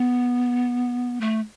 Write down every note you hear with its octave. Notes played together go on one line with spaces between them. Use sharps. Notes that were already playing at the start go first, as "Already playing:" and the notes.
Already playing: B3
A3